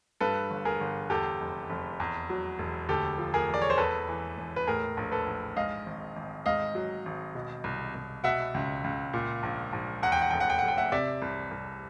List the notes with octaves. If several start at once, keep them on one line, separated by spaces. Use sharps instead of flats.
G2 A4 B4
G1
G#4 A#4
G1
E2 G4 A4
F1
F1
E2
F#3
E1
D2 G4 A4
F3
G#4 A#4
E1
D5
C#5
C5
E2 A4 B4
E3
E1
B4
A2 G#4 A#4
A#1
A4 B4
A#1
G#2 D#5 F5
G#1
G#1
G#2 D#5 F5
F#3
G#1
B2
C2
C2
B2 E5 F#5
C#2
C#2
A#2
A#1
A#1
E2 F#5
G5
F#5
F1 G5
F#5
G5
F1 F#5
G5
E5 F#5
C3 D5 E5
C2
C2